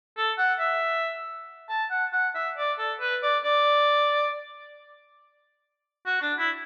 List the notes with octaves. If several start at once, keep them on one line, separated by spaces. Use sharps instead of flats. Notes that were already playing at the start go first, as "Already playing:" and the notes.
A4
F#5
E5
A5
F#5
F#5
E5
D5
A4
B4
D5
D5
F#4
D4
E4